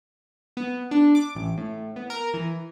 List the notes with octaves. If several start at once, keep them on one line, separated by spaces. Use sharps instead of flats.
B3
D4
D6
A1
A2
B3
A#4
E3